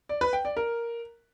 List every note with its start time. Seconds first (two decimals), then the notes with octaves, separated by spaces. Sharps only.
0.09 D5
0.21 B4
0.33 G5
0.45 D5
0.57 A#4